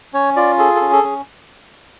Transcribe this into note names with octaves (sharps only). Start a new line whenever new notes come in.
C#4 C#5
F4 D5
G#4 A4
A4
C#4
A4
C#4